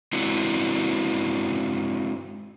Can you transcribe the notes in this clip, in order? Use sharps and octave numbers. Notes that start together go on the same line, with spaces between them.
G#3 C4 D4 E4 F#4